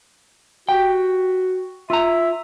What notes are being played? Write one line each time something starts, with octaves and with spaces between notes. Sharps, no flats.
F#4 G4 G5
F4 E5 A#5